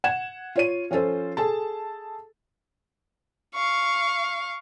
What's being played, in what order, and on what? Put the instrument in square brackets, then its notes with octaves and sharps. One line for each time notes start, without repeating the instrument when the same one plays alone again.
[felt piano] F#5 G#6 E7
F4 C#5 D#7
F3 C#4 F4 A4 C5
G#4 A4 A5
[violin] F5 C#6